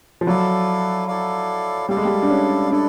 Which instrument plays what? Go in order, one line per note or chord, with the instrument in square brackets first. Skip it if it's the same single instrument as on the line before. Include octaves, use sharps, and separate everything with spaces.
[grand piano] F3
[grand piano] F#3 [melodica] E4 A4 D5 F5
[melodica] E4 A4 D5 F5
[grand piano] G3 [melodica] E4 A4 D5 F5
[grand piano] G#3
G3
D4
C#4
[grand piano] D4 [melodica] E4 A4 D5